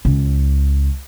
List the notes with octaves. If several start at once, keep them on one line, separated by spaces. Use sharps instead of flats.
C#2 C#3